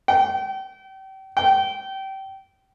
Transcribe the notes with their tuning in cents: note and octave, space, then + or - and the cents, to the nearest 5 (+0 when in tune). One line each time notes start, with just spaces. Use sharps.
G5 -35
G5 -25